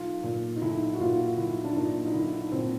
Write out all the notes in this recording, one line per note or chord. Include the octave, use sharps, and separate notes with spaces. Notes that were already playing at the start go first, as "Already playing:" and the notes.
Already playing: B1 F4
A#2
D#4
B1 E4
F#4
A#2 F4
B1 E4
D4
A#2 D#4
D#4
B1 E4
E4
A#2 C4